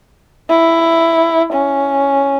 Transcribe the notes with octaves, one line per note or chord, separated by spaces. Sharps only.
E4
C#4